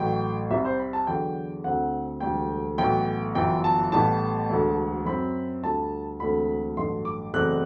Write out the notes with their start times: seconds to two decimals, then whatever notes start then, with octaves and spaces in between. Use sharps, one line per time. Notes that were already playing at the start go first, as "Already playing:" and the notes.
Already playing: A1 A2 F#3 G5
0.51 C2 C3 G3 C4 E5
0.65 C5
0.79 B5
0.93 A5
1.07 E2 D3 F#3 B3 G5
1.64 D2 D3 A3 C4 F#5
2.20 E1 D2 D3 G3 G5
2.78 B1 A2 E3 B3 G5
3.35 G1 F#2 E3 B3 G5
3.64 A5
3.92 A1 A2 G3 B3 A5
4.50 E1 D2 D3
5.06 F#2 F#3 C4 B5
5.63 D2 D3 G3 A5
6.20 E1 D2 D3 A3 C4 B5
6.77 A1 G2 F#3 A3 C6
7.05 D6
7.33 F#1 E2 B2 A3 C4 F#6